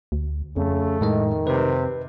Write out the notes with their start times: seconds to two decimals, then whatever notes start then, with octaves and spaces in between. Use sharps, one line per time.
0.12 D2
0.57 F2 C#3 A3
1.01 A2 D#3 G#3 D#5
1.47 C3 B4